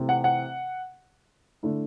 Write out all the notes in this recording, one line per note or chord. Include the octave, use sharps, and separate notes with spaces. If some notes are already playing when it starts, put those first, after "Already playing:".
Already playing: C3 E3 A3 C4
F#5
F#5
D3 A3 E4